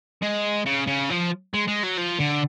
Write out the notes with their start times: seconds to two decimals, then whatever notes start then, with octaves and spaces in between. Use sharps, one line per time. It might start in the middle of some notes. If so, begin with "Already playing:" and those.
0.22 G#3
0.66 C#3
0.87 C#3
1.10 F3
1.54 G#3
1.68 G#3
1.83 F#3
1.98 F3
2.20 D3